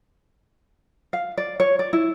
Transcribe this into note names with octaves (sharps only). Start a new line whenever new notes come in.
F5
D5
C#5
D5
E4